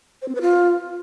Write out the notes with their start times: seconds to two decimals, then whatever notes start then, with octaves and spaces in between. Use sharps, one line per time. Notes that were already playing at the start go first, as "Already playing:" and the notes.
0.22 C5
0.28 C4
0.35 B4
0.41 F4